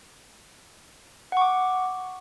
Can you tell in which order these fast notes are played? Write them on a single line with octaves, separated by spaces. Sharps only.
F#5 C#6 D6